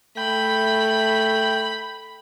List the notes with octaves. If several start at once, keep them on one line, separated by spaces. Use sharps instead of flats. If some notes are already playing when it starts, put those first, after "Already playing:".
A3 G5 B5